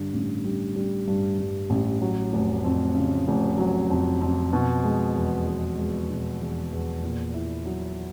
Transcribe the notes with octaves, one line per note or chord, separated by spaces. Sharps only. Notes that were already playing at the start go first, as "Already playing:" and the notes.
Already playing: G2 D3
A1
G3
G3
G2
G2
A1
F#3
F1
F2
C#3
F1
F#3
F2
F2
B2
G#3
E2
B3
G#3
B2
E2
E2
A#2
E4
F#3